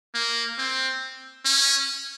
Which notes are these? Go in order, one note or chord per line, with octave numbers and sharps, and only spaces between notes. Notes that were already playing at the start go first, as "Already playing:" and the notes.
A#3
C4
C#4